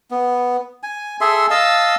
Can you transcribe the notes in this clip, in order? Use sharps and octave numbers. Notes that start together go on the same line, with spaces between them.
B3
G#5
G#4 A4 E5 C6
D#5 F5 A5 E6